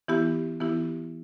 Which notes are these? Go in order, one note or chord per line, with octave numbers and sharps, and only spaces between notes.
E3 B3 E4 G4
E3 B3 E4 G4